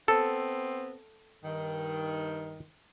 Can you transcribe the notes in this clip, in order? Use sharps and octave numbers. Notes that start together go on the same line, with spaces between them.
B3 C4 A4
G2 D#3